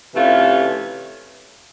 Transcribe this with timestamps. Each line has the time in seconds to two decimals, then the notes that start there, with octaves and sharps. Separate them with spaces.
0.14 C3 E3 A3 C#4 F4